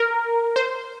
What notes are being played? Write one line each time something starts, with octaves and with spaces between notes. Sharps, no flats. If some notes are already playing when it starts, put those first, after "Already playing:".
Already playing: A#4
C5